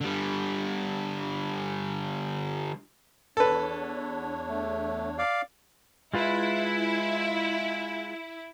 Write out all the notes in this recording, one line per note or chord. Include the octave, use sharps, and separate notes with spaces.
D3 G3
E2 D4 A4 B4 C#5
A3
D5 F5
G#3 E4 F4 B4